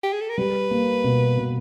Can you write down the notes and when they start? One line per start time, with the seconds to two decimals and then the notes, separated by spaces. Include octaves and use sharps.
0.03 G4
0.13 G#4
0.21 A4
0.29 A#4
0.38 G3 B4
0.71 A#3
1.04 B2
1.37 B2